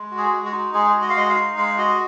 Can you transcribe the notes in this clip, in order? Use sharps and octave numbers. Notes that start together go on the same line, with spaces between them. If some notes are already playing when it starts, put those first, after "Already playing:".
Already playing: G#3
F#4
G#4
G#3
F#4
D#4
G#3 G#4
F#4
D#5
F5
G#3 D#5
F5
D#4
G#3 F5
F#4 D#5